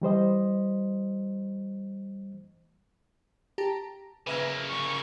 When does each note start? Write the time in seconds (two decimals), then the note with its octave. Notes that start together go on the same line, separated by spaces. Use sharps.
0.02 E3 G3 C5 D#5
3.58 G4 A5 A#5
4.27 C#3 A#3 B4 E5 G#5
4.69 C#6